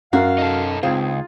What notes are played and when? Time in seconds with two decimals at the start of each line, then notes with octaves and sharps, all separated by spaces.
0.13 F#2 F#4 A#4 F5
0.38 D#4 A4
0.83 C#2 C4 D#4 F4 G#4